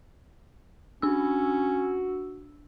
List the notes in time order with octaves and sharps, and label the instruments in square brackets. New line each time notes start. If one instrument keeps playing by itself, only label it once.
[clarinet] C#4 [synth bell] D4 E6 [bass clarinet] F#4